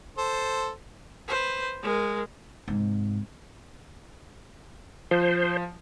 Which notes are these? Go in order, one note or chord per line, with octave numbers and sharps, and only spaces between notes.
A4 C5
B4 C5
G#3 A#4
G#2 C3
F3 C5